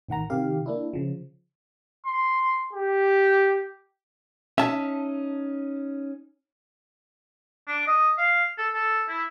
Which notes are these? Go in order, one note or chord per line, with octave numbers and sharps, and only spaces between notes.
A1 D#3 F#5 A#5
C3 D#3 G4 F5
A#3 D4 E4
C#3 F3
C6
G4
C#4 D#4 E5 A5
D4
D#5
F5
A4
A4
E4